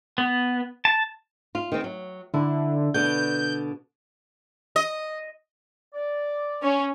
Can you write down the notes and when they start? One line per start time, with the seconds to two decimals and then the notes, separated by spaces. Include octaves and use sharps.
0.18 B3
0.85 A5
1.55 F4
1.72 D#3 C4
1.84 F#3
2.34 D3 E4
2.94 B2 D3 G6
4.76 D#5
5.94 D5
6.62 C#4